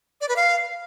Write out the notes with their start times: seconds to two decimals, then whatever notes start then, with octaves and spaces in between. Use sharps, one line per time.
0.21 D5
0.29 B4
0.36 F5